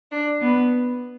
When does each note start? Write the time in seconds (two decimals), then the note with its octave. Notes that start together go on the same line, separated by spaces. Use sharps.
0.11 D4
0.41 B3